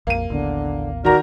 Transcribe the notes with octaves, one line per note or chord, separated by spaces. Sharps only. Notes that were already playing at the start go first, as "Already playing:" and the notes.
A#1 F2 A#3 D#7
A1 D#2 D3 B3
D#3 F#4 A#4 D5 A#5